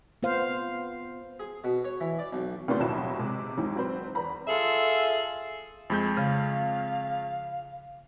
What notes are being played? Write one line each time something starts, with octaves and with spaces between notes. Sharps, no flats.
B3 F4 C5 F5
G#4
B2
C#5
E3
D5
B1
F#1 A2 E3 B3 D5 C6
D#2 B2 F#3 E4 B5 E7
C3 G#3
D#2 G#2 E3 G#3
F#3 C4 B4 C5
E2 B4 A#5 B5
F4 G#4 A4 E5
F2 G#3 B5 G6
C#3 F5